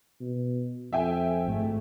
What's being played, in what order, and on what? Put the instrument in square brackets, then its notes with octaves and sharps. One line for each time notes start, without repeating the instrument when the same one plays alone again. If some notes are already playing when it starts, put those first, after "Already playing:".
[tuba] B2
[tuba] F2 [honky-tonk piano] E5 G5 G#5
[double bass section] G#1 A3